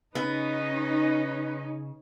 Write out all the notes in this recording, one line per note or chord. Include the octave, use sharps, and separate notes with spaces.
C#3 B3 C#4 D#4 B4